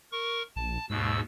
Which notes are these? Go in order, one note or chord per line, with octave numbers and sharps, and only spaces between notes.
A#4 C#6
A#1 A5
D#2 G#2 B2 E6